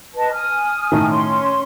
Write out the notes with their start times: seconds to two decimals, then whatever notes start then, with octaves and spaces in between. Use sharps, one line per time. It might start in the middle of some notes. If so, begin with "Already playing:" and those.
0.14 B4 D#5 A5
0.32 G#5 D#6 F6
0.92 A2 D#3
1.10 C#4 C6